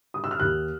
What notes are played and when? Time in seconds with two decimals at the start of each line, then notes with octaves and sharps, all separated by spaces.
0.14 D#6
0.24 E6
0.31 F6
0.40 D#2 F#6